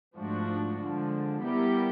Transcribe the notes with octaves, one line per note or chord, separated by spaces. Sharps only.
G#2 F3 A3 D4 F#4
D3 F3 G#3
G3 B3 E4 G4 A#4